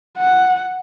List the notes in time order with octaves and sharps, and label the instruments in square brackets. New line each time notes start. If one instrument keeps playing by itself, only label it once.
[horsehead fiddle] F#5